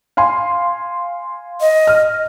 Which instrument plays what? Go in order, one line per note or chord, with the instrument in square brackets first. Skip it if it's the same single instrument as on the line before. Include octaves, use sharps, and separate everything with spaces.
[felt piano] F5 G#5 C6
[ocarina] D#5
[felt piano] F6